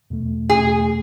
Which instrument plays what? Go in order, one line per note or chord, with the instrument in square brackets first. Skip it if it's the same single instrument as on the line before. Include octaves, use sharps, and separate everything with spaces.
[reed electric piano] E2 B2 A3
[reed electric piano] E2 B2 A3 [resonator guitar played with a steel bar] G#4